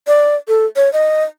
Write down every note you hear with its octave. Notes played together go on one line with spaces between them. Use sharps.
D5
A4
C#5
D#5